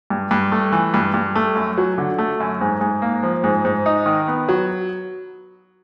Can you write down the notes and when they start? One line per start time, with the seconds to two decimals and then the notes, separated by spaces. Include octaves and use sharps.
0.10 G2
0.31 G2
0.52 A3
0.72 E3
0.94 G2
1.14 G2
1.35 A3
1.56 F#2
1.77 F#3
1.98 D3
2.18 A3
2.40 F#2
2.61 G#2
2.81 G#2
3.02 A#3
3.23 F3
3.44 G#2
3.65 G#2
3.86 D#4
4.06 D#3
4.28 B3
4.49 F#3